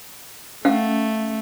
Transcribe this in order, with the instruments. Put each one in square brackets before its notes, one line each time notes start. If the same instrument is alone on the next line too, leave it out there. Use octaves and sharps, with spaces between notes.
[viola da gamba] A3 [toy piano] C#4 F5 F#5